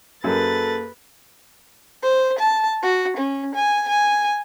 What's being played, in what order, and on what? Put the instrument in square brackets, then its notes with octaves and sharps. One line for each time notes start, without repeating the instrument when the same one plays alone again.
[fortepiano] F#2 [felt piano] A#3 G#4 [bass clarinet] A4 [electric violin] B4 A6
[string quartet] C5
A5
F#4
C#4
G#5
G#5